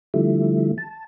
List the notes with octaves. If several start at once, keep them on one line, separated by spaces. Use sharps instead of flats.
D3 F3 G3 A3 E4
A5